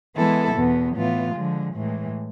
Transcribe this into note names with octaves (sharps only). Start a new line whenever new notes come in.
E3 G#3 B3 E4 A4
E2 B2 B3
A2 E3 B3 F4
D3 F3 G#3
A2 E3 G#3